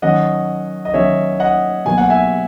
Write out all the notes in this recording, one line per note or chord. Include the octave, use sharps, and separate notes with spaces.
D#3 F#3 C#4 D#5 F#5
D#5
D#3 F#3 C#4 C#5 E5
D#5 F#5
B2 F#3 A#3 G#5
F#5
E5 G#5